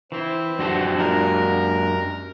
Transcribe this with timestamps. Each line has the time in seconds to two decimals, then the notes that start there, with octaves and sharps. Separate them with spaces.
0.12 E3 C4 E4
0.59 F#2 D3 F3 F#4 G4 A4
0.98 G#3 A#3 D4 A#4